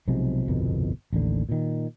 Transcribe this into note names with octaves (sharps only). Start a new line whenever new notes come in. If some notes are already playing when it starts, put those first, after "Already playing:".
B1 C3 F3 G#3
G1 C2 F2 B2
A1 D#2 D3
A#2 D#3